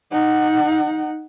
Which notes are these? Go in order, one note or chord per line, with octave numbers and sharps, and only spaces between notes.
D#4 F#5